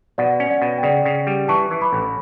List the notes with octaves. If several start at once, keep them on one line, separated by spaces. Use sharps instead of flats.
B2 D5 F#5
C#4
D5 F#5
B2
G5
C#3 D5 F#5
C#3
G3
E3 A5 C#6
E3
B5 D6
A1